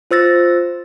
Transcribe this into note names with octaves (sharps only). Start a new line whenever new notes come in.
F4 C5 E6 A6 A#6